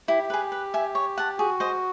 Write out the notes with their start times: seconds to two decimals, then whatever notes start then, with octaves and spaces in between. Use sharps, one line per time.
0.08 E4 G4
0.30 G#4 B4
0.52 B4
0.74 E5 G#5
0.95 C#5
1.18 F#5 A5
1.38 F#4 G#4
1.60 C5 D#5